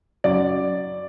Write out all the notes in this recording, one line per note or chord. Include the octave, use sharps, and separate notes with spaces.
F#2 D5